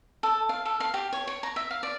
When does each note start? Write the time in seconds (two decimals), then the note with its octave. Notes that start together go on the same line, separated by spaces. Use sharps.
0.23 A4
0.49 F5
0.66 A4
0.80 F5
0.94 G4
1.13 C#5
1.27 C#5
1.43 A#5
1.56 E5
1.71 F5
1.83 D5